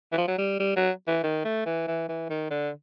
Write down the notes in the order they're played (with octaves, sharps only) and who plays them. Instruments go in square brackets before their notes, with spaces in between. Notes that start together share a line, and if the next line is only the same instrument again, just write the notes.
[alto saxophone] E3
F3
F#3
G3
G3
F#3
E3
D#3
A3
E3
E3
E3
D#3
D3